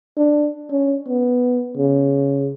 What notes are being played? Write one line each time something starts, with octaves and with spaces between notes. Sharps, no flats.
D4
C#4
B3
C#3